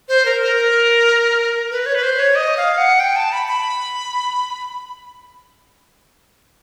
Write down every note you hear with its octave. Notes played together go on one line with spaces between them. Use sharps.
C5
A#4
A#4
B4
C#5
B4
C5
C#5
D#5
F5
F#5
G5
A5
B5
B5